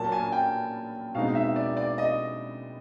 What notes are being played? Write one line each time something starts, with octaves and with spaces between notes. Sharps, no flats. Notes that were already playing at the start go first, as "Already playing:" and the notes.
Already playing: A#2 F#3 A#3 A5
G#5
G5
B2 G#3 C4 D#4 F5
E5
D5
D5
D#5